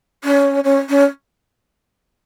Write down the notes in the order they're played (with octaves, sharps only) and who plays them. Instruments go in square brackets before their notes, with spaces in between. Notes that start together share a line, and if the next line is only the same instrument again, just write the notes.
[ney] C#4
C#4
C#4